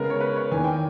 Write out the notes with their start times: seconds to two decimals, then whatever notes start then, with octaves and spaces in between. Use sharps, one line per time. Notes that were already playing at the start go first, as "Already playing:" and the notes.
Already playing: C#3 G#3 B3 A#4
0.10 C#5
0.20 B4
0.36 C#5
0.51 E2 D#3 A#3 G#5
0.64 G5